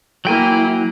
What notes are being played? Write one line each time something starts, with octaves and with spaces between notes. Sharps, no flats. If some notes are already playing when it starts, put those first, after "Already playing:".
F#3 A#3 E4 G5 G#5